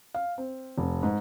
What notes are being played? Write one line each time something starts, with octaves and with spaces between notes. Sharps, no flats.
F5
C4
F1
G#2